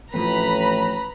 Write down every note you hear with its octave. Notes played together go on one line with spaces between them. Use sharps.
A1 A2 F3 A3 C4 B4 A#5 B5